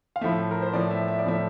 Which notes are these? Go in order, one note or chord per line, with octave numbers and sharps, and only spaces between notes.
F5
A2 F3 A3 E5
A#4
C5
A2 F3 A3 D5
E5
E5
D5
A2 F3 A3 E5